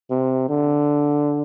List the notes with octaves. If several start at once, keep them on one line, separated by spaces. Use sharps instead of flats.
C3
D3